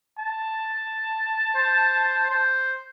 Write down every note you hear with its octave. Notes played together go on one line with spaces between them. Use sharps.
A5
C5
C5